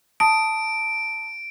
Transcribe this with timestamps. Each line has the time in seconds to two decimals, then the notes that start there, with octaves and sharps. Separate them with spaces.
0.20 A5 D#6 D7